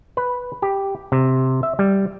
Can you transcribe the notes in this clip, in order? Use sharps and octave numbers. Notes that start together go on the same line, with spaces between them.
B4
G4
C3
E5
G3